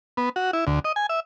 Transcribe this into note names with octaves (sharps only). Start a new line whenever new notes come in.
B3
F#4
E4
D2
D#5
G#5
E5